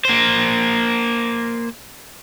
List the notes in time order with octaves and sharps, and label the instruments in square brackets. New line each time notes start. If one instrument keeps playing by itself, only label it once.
[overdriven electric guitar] A#3 C5